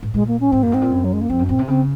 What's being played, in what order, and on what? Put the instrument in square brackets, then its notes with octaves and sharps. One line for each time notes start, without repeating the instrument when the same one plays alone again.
[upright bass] G#2
[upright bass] A#2 [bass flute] G#3
[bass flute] A#3
C#4
[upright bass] G#2 [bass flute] C4
[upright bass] F#2 [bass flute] A#3
[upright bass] G#2 [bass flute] C4
[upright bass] A#2
F#2
[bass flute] F#3
G#3
A#3
[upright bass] F2 [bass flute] C4
[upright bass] F#2
[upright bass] A#2 [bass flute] C4
[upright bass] C3
[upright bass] C#3 [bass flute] C4